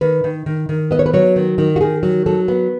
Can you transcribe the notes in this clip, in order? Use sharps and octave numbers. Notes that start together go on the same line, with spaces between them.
D#3 B4
D#3
D#3
D#3
B3 D#5
C#5
B4
F#3 C#5
D#3
D#3
F#4
D#3 G#4
F#3
F#3 A4
B3